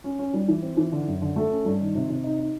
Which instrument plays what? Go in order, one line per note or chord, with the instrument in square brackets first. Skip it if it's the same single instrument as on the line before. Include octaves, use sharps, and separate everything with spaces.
[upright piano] C#4
C#4
G3
E3
C4
E3
D3
F#2
D3
A3
C#4
G2
D#3
C3
C3
D#4
D#4